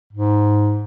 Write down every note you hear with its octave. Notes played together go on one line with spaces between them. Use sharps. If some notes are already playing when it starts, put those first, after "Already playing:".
G#2